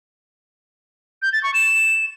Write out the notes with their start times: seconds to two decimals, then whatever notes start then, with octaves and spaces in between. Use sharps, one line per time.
1.22 G6
1.33 A6
1.43 C#6
1.54 E7